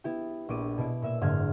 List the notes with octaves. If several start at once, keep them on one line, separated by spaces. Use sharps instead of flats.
B3 E4 G4
A#1 B3 D6 D#7
B2 E4 D7
A#2 E5 E6
F#1 G#2 D3 E5 F6 G#6